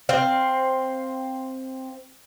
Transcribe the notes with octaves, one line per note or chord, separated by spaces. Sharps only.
C4 F5